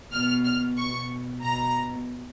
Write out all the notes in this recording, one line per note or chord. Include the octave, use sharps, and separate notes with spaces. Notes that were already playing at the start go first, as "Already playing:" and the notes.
B2 F6
F6
B2 C#6
B2 A#5